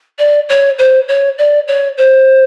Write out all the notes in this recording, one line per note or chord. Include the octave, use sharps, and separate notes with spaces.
D5
C#5
C5
C#5
D5
C#5
C5